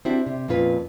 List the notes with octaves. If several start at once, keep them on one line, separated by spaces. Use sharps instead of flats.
C4 D4 E4 F#4 G4
C3
F2 A#2 C#4 F4 B4